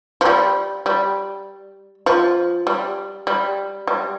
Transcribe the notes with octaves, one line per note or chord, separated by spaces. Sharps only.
F3
G3
G3
F3
G3
G3
G3